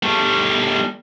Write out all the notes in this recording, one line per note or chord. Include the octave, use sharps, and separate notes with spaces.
G3 A3